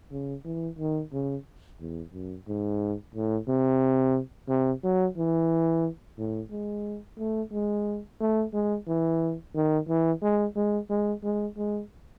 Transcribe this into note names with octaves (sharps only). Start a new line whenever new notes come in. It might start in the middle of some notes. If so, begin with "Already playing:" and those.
C#3
E3
D#3
C#3
E2
F#2
G#2
A2
C3
C3
F#3
E3
A2
G#3
A3
G#3
A3
G#3
E3
D#3
E3
G#3
G#3
G#3
G#3
G#3